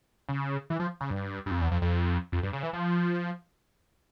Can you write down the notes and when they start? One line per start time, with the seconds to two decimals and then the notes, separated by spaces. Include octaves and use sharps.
0.29 C#3
0.70 E3
0.80 F3
1.01 C#3
1.10 G2
1.46 G2
1.51 F2
1.61 E2
1.71 F2
1.82 F2
2.32 F2
2.43 G2
2.53 C#3
2.63 E3
2.73 F3